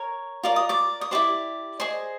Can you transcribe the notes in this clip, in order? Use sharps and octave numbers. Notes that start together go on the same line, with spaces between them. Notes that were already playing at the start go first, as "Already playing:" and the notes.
Already playing: A#4 C#5
F4 A#4 D5 D6
D#6
D5 D6
D#6
E4 G4 C5 D5 D6
G#4 C5 D#5